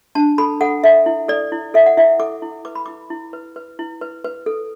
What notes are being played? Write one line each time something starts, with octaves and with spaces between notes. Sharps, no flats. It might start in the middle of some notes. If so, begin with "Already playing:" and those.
D4 A5
A4 B5
A4 F#5
A4 E5
E4
A4 D5
E4
A4 E5
F#5
E4 E5
A4 D6
E4
B4 D6
B5
E4 D6
E4
B4
B4
E4
B4
B4
A4